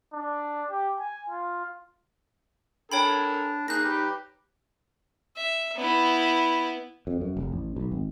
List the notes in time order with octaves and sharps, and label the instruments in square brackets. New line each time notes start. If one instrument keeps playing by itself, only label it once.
[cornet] D4
G4
G#5
F4
[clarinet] D4 [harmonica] A4 A#4 G#5 [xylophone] C#5 G5 B5
[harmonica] A#3 G#4 [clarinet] D#4 [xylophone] F#6 A#6
[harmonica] G4 B4
[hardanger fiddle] E5
B3 E4
[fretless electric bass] F2
F#2
F1
A1
B1
G#1